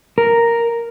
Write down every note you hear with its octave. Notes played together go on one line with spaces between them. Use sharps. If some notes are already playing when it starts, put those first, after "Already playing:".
A#4